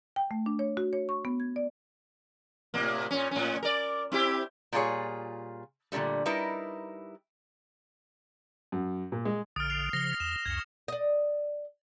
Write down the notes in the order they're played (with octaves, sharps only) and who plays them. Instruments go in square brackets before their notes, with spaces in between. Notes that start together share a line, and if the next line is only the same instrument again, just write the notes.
[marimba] G5
A3
D4
C#5
F#4
C#5
C#6
B3
G#6
D5
[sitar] A2 C3 A#3
A#2 C#4
A2 C#4
A#4 D5
C4 E4 G4
[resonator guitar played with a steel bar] A#2 G3 F4 G#4 C#5
A#2 D3 D#3 G3 A3
G3 D#4 E4 A#4 B4
[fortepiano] F#2
A#2
G#3
[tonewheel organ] A#1 D3 [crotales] D#6 F6
[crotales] C7 F7
[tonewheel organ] C#3 F3 [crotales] A#6 G7
[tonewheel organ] E2 [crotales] E7
[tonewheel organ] C#2 F#2 [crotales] G#6 C#7
[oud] D5 D#5